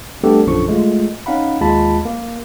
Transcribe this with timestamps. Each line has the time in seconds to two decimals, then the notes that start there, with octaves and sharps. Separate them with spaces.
0.24 G3 A3 B3 D4 G4 A4
0.47 A#1 F#2 D3 F3 C#6
0.69 G#3 A3 F4
1.26 C#4 D#4 F5 F#5 B5
1.61 D#2 G#3 F4 A5 B5
2.05 A#3